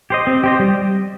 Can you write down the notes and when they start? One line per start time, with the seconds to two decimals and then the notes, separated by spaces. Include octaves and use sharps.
0.10 G4 C5 D#5
0.27 C4
0.44 G4 C5 D#5
0.60 G3